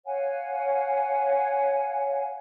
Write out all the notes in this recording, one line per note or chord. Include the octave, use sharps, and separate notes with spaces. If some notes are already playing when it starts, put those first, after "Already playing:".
C#5 F5 F#5 G#5